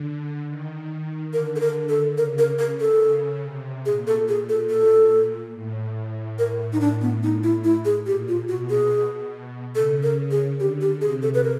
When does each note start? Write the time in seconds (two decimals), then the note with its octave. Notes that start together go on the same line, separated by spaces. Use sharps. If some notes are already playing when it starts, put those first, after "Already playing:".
Already playing: D3
0.48 D#3
1.33 D3 A#4
1.56 A4
1.60 A#4
1.89 A4
2.17 C#3 A#4
2.39 A#4
2.59 A#4
2.80 A4
3.02 C#3
3.44 C3
3.85 A#2 G#4
4.07 A4
4.28 G#4
4.49 A4
4.70 A4
5.54 A2
6.39 A#4
6.73 D#4
6.81 D4
7.02 B3
7.23 D#4
7.44 E4
7.64 E4
7.85 G#4
8.06 A#2 G4
8.28 F4
8.49 B2 F#4
8.70 G#4
9.75 C#3 A4
10.03 A#4
10.31 G#4
10.60 D3 G4
10.81 G4
11.01 C3 G#4
11.22 A4
11.34 B4
11.44 A#4